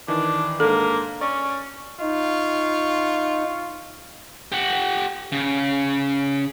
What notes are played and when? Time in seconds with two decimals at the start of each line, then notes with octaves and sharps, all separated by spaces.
0.08 D#3 E3 D4
0.60 G#2 A#3 D4 A4
1.21 C#4 D5
2.00 D#4 F4 C#6
4.52 G4 F#5
5.32 C#3